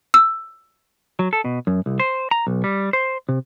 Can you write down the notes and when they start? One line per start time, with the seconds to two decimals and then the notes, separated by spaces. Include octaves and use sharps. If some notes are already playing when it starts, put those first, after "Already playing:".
0.14 E6
1.19 F#3
1.33 A4
1.45 B2
1.67 F#2
1.86 C2
2.00 C5
2.31 A#5
2.47 B1
2.64 G3
2.93 C5
3.29 C3